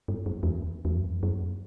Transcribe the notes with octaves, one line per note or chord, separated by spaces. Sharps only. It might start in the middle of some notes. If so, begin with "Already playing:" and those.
G2
F#2
E2
E2
F#2
F#2